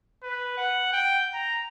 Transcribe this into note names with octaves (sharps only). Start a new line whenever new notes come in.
B4
F#5
G5
A#5